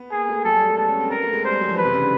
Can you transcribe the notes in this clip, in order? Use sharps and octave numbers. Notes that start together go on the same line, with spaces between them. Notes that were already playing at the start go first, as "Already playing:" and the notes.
Already playing: B3
A#3 G#4
A3
F#3 A4
G3
G#3
A3
B3 A4
C#4
C4
B3 A#4
A3
G#3
G3 C5
G#3
F#3
F3
E3 B4
C3
C#3
D3